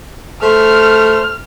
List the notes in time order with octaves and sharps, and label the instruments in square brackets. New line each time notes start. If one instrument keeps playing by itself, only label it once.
[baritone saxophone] A3 [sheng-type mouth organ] C5 [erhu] F6